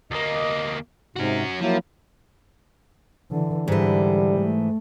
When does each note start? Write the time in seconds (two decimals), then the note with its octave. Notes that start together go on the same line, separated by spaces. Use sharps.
0.11 D2 A#3 D#5
1.16 G#2 C3 C#4 F#4
1.61 F3 F#3 A#3 E4
3.31 D3 E3
3.68 G#2 D3 E3 G3
4.39 A3